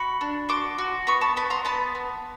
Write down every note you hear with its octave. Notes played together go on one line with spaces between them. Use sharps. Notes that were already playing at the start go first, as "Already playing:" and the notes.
Already playing: F#4 B5 C#6
D4
F#4 C6 D6
F#4
B3 B5 C#6
A5 B5
B3 A5 B5
A#5 C6
B3 A5 B5
B3